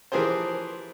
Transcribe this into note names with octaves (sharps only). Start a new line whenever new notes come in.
E3 F3 G4 G#4 A#4 C5